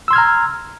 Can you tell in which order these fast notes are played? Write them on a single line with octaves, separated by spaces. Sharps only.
E6 C6 G#6 F6 A#5